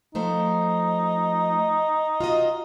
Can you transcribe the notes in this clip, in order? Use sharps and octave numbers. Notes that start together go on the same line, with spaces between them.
F3 A3 D#4 C5
F4 F#4 D#5